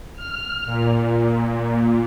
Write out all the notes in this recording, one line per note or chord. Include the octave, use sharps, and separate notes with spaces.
F6
A#2